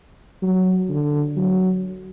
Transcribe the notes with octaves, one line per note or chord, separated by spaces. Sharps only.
F#3
D3
F#3